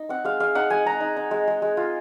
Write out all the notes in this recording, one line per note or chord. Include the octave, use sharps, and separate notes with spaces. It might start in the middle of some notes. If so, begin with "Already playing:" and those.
Already playing: D#4
C4 F#5
G#3 F5
G#3 F5
D#4 F#5
G#3 G#5
G#3 A#5
D#4
D#4
G#3
G#3
G#3
F4